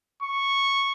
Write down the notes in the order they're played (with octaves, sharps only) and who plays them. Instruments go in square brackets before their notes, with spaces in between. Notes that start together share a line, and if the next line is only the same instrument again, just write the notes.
[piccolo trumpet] C#6